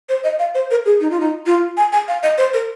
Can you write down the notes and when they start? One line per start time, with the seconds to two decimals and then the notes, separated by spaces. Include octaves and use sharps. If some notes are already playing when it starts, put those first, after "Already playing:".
0.09 C5
0.24 D#5
0.39 F5
0.55 C5
0.71 A#4
0.85 G#4
1.01 D#4
1.11 F4
1.20 D#4
1.46 F4
1.77 G#5
1.93 G#5
2.08 F5
2.23 D#5
2.38 C5
2.54 A#4